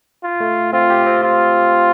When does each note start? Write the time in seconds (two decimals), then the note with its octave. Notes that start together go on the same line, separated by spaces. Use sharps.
0.24 F4
0.40 A3
0.73 C4 F4
0.90 G4
1.06 C4
1.24 F4